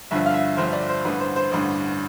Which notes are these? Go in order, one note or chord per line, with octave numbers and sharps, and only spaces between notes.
G1 G2 D3 F3 E5
F5
E5
G1 G2 D3 F3 C5
D5
C5
A1 G2 D3 B4
C5
C5
A1 G2 D3 C5